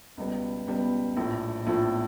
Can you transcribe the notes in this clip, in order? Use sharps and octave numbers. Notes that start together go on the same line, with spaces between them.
C#2 B2 G3 B3
C#2 B2 G3 B3
A#1 A2 F3
A#1 A2 F3